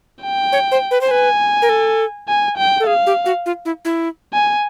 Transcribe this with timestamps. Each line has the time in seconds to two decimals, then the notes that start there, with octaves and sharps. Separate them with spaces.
0.23 G5
0.52 C#5
0.71 C5
0.91 B4
1.01 C5
1.11 B4 G#5
1.62 A#4
1.69 A4
2.28 G#5
2.58 G5
2.80 A4
2.87 G#4 F5
3.06 G4
3.26 F#4
3.46 F4
3.65 E4
3.85 E4
4.33 G#5